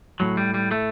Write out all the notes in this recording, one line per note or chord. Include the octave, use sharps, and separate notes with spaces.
A2 F#3
G3
G3
A3